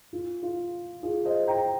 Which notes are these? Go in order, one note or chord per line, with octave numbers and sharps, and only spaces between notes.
F4
F4
F4 G#4
C5 D#5
G5 A#5